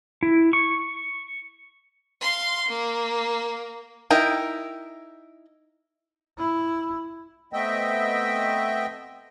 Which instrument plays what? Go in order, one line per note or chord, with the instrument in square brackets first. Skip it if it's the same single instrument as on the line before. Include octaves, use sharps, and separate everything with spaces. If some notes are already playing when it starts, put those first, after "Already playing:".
[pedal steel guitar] E4
C#6
[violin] F5 C6
A#3
[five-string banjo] D#4 E4 A#4 G5
[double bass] E4
[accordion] A3 B3 C4 D#5 E5 G5